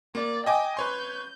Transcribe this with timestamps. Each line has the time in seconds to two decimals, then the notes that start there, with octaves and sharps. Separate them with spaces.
0.15 A#3 D5
0.46 D#5 G5 G#5 D6
0.77 B4 C#5 C6 G6